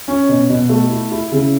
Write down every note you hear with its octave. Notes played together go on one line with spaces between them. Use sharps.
C#4
B2
B2
A3
E4
E4
C#3